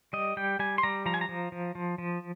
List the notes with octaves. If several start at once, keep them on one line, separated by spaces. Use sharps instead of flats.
G3 D#5
G3 G5
G3 G#5
C6
G3 A#5
F3 A#5
G#5
A#5
F3
F3
F3
F3